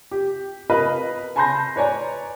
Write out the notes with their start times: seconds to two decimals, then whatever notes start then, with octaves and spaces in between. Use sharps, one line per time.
0.11 G4
0.70 A#4 B4 D#5 F5 B5
1.36 G#5 A5 B5 C6 G6 A#6
1.76 B4 C#5 D5 G#5 A#5